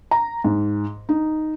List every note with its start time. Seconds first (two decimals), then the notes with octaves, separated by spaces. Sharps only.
0.11 A#5
0.44 G#2
1.09 D#4